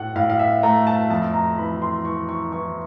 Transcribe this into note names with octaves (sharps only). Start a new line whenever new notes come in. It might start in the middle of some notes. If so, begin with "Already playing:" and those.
Already playing: A2 A3 F#5
A2 F5
F5
E5
A3 A#5
A5
F2 A5
A#5
E3 B5
C6
E3 C#6
C#6
E3 C#6